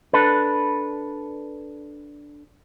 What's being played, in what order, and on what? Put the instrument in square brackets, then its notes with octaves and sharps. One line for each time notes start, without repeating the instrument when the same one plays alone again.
[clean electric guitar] D4 A4 B4